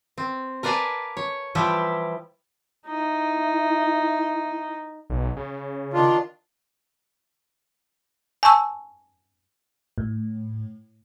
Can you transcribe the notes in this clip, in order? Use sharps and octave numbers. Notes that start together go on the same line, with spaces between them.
C4
A#4 B4 D5 F5 G#5 A5
C#5
E3 F3 G3 E4 G4 E5
D#4 E4
B1
C#3
D#3 D4 F4
G#5 A5 C#6 E6
A2